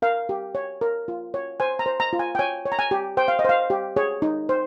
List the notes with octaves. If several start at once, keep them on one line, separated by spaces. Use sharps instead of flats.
A#4 F5
G4
C#5
A#4
F4
C#5
C5 G#5
A#5
C5
A#5
F4
G#5
G5
C#5 G#5
C#5
A#5
G#5
G4
C5 G5
F5
D#5
C5 F5
G4
G#4 C#5
D#4
C5